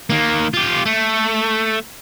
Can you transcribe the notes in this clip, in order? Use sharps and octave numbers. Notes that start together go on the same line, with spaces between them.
D#3 A#3
F4 G4
A3